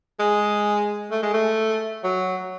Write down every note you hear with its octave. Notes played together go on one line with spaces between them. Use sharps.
G#3
A3
G#3
A3
F#3